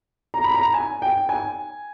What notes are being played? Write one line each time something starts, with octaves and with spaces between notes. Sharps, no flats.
A#5
B5
A#5
G#5
G5
G#5